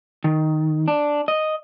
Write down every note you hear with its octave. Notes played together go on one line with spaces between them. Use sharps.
D#3
D4
D#5